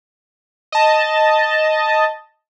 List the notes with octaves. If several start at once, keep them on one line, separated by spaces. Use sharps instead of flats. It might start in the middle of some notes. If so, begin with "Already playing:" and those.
D#5 A5